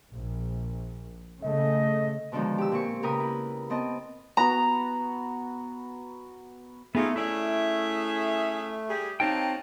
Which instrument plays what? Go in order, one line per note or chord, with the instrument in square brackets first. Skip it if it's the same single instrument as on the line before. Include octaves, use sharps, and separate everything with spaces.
[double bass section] A#1
[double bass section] C#3 A3 [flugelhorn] D#5
[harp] B2 D3 D#3 F3 G#3
G4 E6
A#2 C4 C#6
C#3 G4 A#4 B4 D#6
E4
B3 C4 D#5 A5
[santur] B3 F#4 [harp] A#5
[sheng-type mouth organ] A3 [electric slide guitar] B3 D#4 A4 [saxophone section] F4 G#4
[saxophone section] C#4 G#4 E5 [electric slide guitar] E4 D5
[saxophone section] G3 G4 G#4
[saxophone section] F#3 A#3 D#4 [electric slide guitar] C4 C5 G5 [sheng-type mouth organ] A5